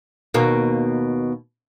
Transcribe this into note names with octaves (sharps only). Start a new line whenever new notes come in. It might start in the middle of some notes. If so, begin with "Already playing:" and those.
D#2 B2 A#3